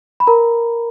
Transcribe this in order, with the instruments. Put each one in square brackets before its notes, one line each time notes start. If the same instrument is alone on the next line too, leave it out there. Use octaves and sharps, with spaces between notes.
[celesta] B5
A#4 B4 A#5